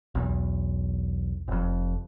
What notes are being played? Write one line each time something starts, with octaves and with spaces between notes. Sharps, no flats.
B1 E2
F1 F2